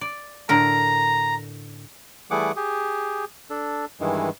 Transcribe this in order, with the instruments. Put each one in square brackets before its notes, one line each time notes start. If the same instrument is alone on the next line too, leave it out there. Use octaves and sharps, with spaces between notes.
[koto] D5
[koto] A2 D3 A#4 [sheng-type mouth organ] A#5
[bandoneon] E3 G3 A3 G#4 F#5 D6
G4 G#4
D4 A4
G2 D#3 E3 G#3